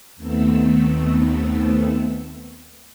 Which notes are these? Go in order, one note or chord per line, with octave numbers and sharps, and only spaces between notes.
D#2 D#3 A3 B3 C4 E6